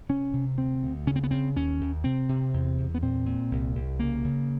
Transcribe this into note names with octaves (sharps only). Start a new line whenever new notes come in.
C3 C#4
C3
D2 C4
D2
C#3 C#4
C4
B3
C#3 C4
D#2 C#4
D#2
C3 C4
C3
E2
E2
B3
A#2 C4
A#2
C2
C2
C#3 A#3
C#3